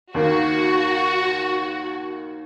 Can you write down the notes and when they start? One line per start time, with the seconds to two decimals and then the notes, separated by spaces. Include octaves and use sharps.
0.14 D#2 D#3 A#3 F#4